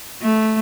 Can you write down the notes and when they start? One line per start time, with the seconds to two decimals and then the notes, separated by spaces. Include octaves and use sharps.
0.22 A3